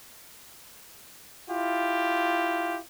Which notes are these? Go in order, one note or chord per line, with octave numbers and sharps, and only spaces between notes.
E4 F4 G4